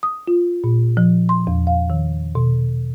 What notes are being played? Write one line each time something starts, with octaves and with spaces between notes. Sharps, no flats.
D#6
F4
A#2
F3
C6
E2
F5
D#3
B2